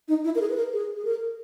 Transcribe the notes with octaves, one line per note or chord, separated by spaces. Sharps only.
D#4
E4
A#4
G#4
B4
A#4
G#4
G#4
A#4